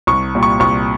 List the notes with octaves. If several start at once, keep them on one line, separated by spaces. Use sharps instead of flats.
C2 C#6
A#2 G3
C#6
C2 C#6